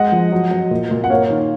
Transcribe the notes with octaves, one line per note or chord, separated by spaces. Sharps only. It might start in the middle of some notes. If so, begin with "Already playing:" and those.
Already playing: G#3 D#5 F#5
F3
F#3
F#3
A#2
A#2
F#5
A#3 C#5 F5
D#3